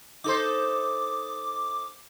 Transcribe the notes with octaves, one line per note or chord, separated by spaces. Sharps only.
D#4 A4 C5 D6